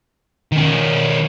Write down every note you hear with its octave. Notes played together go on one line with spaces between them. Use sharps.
D#3 C#4